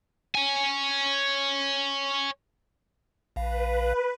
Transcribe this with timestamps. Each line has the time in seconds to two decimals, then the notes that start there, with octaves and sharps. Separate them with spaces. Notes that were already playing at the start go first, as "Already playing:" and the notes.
0.35 C#5 G#5
3.36 A#1 B4 F5